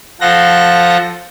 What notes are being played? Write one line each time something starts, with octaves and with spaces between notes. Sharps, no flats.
F3 F4 A4 F#5 A#6